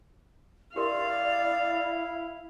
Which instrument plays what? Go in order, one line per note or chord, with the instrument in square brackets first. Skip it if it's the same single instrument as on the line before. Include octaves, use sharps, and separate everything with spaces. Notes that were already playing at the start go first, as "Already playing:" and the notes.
[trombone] E4 [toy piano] G4 A#4 C6 [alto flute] D5 [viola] F5